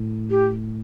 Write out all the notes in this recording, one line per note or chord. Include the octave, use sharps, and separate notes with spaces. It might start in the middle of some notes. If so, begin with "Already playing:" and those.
Already playing: A2
G4